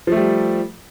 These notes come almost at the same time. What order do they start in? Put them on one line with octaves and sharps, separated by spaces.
F3 A3 G3